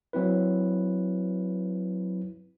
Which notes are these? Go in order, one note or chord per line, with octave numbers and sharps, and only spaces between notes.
F#3 C4 E4 B4